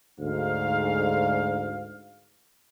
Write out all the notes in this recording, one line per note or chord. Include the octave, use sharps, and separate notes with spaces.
D2 G#2 F5